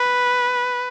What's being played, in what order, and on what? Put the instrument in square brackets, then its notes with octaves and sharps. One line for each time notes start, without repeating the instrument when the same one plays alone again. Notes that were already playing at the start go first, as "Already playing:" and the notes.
Already playing: [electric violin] B4